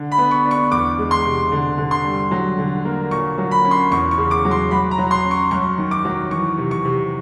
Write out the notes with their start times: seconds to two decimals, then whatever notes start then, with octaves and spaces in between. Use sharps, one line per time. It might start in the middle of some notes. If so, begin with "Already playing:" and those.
Already playing: D3
0.12 B5
0.18 B3
0.31 C#6
0.45 D4
0.51 C#6
0.71 E2 D6
0.98 G#3
1.11 C6
1.25 C3
1.52 D3
1.78 D3
1.91 C6
2.05 G3
2.31 F#3
2.58 D3
2.85 A#3
3.11 A#2 C#6
3.38 F#3
3.51 B5
3.64 C#4
3.71 C6
3.91 E2 C#6
4.11 C#6
4.18 C#3
4.31 D6
4.45 F#3
4.51 C6
4.71 F#3 B5
4.91 A#5
4.98 F#3
5.11 C6
5.25 C#4
5.31 C#6
5.51 F#2 C#6
5.78 D#3
5.91 D6
6.05 F#3
6.31 E3 C#6
6.58 C3
6.71 C#6
6.85 C3